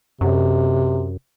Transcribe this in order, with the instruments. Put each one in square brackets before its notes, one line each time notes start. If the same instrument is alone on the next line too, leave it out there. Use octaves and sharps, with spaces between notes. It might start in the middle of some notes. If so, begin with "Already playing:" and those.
[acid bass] F#2 [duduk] C3